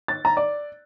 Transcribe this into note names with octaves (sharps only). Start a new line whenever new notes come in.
A6
A#5
D5